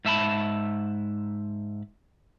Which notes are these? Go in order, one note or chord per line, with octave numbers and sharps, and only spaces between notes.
G#2 E5 A5 B5